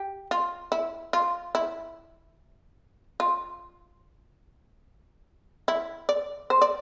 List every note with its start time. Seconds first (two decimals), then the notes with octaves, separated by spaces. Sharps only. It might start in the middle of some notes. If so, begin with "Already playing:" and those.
Already playing: G4
0.31 F4
0.72 E4
1.13 F4
1.55 E4
3.20 F4
5.68 E4
6.09 D5
6.50 C5
6.62 D5